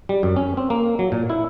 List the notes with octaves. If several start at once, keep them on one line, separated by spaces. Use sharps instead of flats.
G3
F#2
C#4
C4
A#3
F#3
A#2
E4